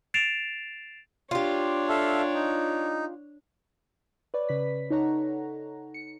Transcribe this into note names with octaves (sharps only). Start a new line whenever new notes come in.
A6 C7 D7 E7 F7
D4 F4 G4 C#5
A4 E5 F5
D#4
B4 C#5 D5
C#3 B4 B6
D#4 A4 C#5 F#5 A#5
C#7